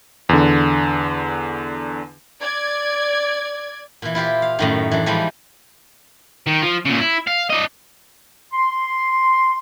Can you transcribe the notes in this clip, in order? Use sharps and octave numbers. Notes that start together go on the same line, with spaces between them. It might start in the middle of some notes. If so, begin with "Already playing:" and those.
E2 D3
D5 G#6
A#2 E3
E4 F4 G4 C5
F5
F#2 A2 D#3
E3 D4
E3 F3 G3 G#3 D#4
D#3
F3
A#2 C#3
E4
F5
D4 D#5
C6